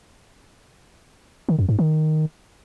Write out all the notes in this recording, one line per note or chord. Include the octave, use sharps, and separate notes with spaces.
D#3
F#2
G#2
D#3